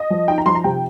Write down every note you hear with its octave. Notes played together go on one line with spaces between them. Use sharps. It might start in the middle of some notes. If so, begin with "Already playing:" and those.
Already playing: D#5
F3
D#4 G5
A#5
F3 C6
A#5
C3 G5